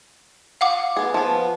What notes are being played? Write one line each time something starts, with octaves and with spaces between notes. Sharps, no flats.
F5 F#5 D6
B3 G#4
F3 B3